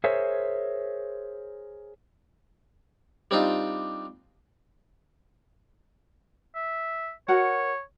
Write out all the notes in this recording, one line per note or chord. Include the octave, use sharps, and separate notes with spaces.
G#4 A#4 C5 C#5 E5
G3 C4 D4 D#4 F4
E5
F#4 A#4 C#5 F#5